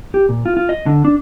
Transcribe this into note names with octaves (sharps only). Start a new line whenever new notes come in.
G4
A#2
F4
F4
D#5
D3
D4